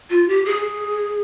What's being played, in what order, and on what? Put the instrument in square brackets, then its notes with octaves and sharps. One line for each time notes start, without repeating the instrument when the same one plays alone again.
[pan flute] F4
G4
G#4